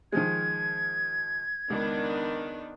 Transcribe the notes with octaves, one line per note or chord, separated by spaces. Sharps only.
D#3 F3 G#3 G#6
C#2 D#3 B3 D4